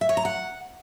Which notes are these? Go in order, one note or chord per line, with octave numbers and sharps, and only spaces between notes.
E5
C#5
A#5
F#5